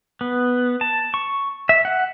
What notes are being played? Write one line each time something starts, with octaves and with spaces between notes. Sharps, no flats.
B3
A5
C#6
E5
F#5